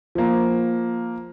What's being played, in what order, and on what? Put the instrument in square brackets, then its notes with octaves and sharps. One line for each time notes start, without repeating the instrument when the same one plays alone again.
[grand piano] F3 A#3